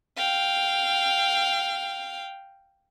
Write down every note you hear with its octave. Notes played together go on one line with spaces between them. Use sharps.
F5 G5